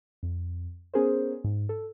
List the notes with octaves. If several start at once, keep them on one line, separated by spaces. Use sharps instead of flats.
F2
B3 C#4 G#4 A#4 C5
G#2
A4